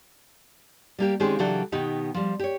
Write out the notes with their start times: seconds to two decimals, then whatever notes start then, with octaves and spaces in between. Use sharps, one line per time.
0.98 G3 A#3 G4
1.20 D#3 G#3 C4 C#4 G4 G#4
1.39 C#3 E3 F#3 D4 G4 A4
1.72 B2 D#3 B3 D#4 G4
2.14 F3 G3
2.39 G4 C#5